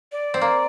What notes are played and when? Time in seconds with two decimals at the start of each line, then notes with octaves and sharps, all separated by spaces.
0.12 D5
0.34 C4
0.41 A#3